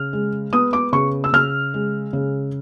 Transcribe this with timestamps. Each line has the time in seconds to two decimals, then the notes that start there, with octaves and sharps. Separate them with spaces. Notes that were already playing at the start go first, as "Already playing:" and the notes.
Already playing: C#3 F6
0.13 G#3
0.53 B3 D#6
0.73 D6
0.93 C#3 C#6
1.24 E6
1.33 C#3 F6
1.74 G#3
2.13 C#3